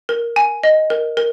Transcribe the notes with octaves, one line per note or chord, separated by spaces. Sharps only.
A#4
G#5
D#5
A#4
A#4